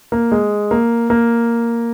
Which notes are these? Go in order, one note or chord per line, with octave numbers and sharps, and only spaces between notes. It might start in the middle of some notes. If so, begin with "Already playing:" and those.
A#3
G#3
A#3
A#3